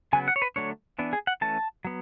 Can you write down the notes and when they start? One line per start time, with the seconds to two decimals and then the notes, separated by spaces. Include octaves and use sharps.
0.13 C#3 F#3 B3 G#5
0.28 F#5
0.36 C#5
0.42 B4
0.56 D3 F#3 A3 D4 C#5
0.99 E3 B3 D4
1.13 G#4
1.27 F#5
1.41 E3 A3 C#4 A5
1.85 F#3 B3